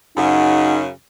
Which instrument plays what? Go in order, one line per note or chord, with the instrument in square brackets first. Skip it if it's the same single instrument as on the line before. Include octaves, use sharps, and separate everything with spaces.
[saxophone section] F#2 C#3 [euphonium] D#4 [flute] F#5